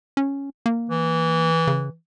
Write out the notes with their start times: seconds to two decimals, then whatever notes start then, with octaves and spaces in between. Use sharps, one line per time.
0.17 C#4
0.66 A#3
0.90 E3
1.67 C#3